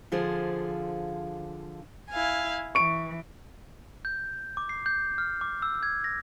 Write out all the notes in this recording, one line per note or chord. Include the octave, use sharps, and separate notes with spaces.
D3 F3 F4 G#4 C5
E4 F5 G#5
E3 C#6 D7
G6
D6
C7
G6
F6
D6
E6
G#6
A#6